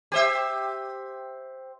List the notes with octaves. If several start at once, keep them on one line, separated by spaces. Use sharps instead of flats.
G4 C5 E5